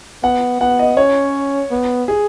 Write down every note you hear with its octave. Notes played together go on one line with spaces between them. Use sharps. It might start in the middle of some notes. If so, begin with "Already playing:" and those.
B3 F#5
B3 F#5
D#5
C#4 C#5
B3
G#4